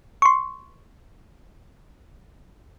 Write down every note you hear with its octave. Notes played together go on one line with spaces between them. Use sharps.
C6 C#6